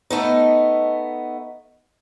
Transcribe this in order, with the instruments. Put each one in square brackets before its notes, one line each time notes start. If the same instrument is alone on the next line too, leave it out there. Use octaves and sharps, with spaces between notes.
[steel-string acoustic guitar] A3 B3 D#4